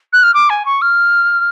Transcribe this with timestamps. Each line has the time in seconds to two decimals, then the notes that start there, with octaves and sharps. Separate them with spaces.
0.13 F#6
0.23 F6
0.34 D6
0.50 G#5
0.66 C#6
0.82 F6